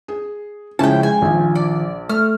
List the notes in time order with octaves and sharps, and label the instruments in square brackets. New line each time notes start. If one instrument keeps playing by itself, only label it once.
[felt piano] G#4
[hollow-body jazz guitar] C#3 C#4 E4 [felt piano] F3 G#3 [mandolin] G5 A5
[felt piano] G#3 [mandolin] G#5
[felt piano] A#1 [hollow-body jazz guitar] D#3 F3
[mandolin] D5
[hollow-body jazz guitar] A3 [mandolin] F6